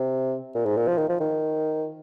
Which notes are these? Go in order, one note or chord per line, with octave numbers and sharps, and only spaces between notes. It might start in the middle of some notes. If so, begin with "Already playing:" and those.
Already playing: C3
A#2
G#2
A#2
F3
D#3
F3
D#3